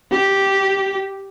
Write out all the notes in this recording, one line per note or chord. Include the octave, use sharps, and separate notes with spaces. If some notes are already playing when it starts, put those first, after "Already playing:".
G4